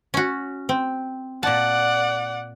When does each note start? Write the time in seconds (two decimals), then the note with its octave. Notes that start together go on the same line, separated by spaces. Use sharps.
0.14 C#4 F#4
0.69 C4
1.43 A#2 D5 F#5 A5